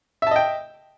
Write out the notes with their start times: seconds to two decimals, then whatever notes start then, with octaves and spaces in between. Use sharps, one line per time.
0.22 E5
0.27 A5
0.31 D#5
0.36 G5